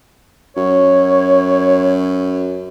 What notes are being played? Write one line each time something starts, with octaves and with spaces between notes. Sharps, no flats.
F#2 C#5